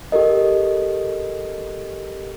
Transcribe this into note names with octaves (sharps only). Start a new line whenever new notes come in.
G4 A4 A#4 D#5